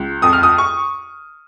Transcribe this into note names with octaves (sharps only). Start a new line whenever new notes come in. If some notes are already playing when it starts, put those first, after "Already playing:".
Already playing: C#2
F2 D#6
F6
D#6
C#6